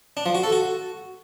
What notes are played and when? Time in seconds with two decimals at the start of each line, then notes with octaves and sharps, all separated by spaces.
0.17 D4
0.26 F3
0.35 F#4
0.44 A4
0.52 F#4